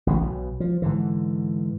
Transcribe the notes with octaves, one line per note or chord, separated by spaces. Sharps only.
A1 D3 E3
B1 B2
F3
G#2 D3 E3